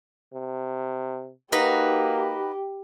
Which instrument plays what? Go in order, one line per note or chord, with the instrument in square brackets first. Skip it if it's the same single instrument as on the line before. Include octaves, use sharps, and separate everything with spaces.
[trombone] C3
[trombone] A#3 [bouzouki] D#4 F#4 B4 [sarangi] G4